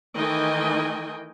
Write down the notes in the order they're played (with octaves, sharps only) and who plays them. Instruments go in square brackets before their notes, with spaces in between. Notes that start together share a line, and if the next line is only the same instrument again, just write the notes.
[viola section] D#3 E3 A3 D#5 G5 G#5